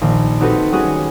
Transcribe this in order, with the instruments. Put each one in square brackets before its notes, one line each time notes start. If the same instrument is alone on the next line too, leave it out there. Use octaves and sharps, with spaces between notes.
[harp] A#1 D#3 A#5
C4 D#4 F#4 G4 A4 B4
G3 C#4 D#4 F#4 G#4 B4